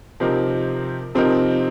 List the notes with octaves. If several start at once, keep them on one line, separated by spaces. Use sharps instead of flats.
C3 F3 C4 D#4 A#4
C3 F3 C4 D#4 A#4